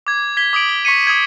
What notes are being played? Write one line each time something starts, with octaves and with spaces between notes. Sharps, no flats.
D6 G#6
G#6 B6 G7
D6 D#6 G#6 D7 F#7
G7
C#6 B6 C#7 D#7
D#6 G#6